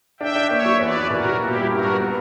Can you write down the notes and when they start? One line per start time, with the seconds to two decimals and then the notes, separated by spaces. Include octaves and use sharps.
0.20 D4 E5 G5
0.36 D4
0.50 A#3 C#5 E5
0.66 F#3
0.80 E2 B4 D5
0.95 E4
1.10 B2 F#4 A#4
1.25 F#3
1.40 A#2 E4 G4
1.55 G3
1.70 G2 F#4 A#4
1.85 G2
2.00 B3